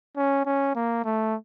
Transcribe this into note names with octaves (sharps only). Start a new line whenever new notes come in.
C#4
C#4
A#3
A3